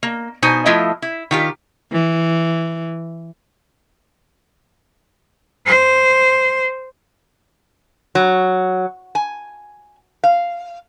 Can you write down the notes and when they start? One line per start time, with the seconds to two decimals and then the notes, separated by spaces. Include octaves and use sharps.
0.03 A#3
0.42 B2 D#4 C5 G#5
0.66 F3 A3 E4 F4 D#5
1.02 E4
1.31 D#3 F4 G4
1.92 E3
5.66 C5
8.15 F#3
9.15 G#5
10.24 F5